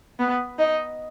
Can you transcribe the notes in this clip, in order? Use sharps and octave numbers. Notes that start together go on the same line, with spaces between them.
B3
D#4